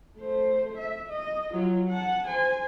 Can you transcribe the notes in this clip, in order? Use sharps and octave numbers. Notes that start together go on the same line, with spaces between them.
A3 C5
E5
D#5
F#3 F4
F#5 A5
C5 G#5